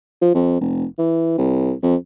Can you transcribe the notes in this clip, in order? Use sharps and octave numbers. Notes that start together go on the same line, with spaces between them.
F3
F2
F1
E3
C2
F2